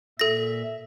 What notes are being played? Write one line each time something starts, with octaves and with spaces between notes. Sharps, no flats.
A#2 A4 E5 A#6